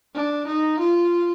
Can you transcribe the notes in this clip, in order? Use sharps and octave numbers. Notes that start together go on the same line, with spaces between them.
D4
D#4
F4